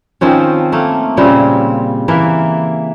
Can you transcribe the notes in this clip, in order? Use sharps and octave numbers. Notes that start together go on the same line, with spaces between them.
D#3 F3 C4 C#4
A3 A#3
A#2 C#3 G3 C4
E3 A#3 E5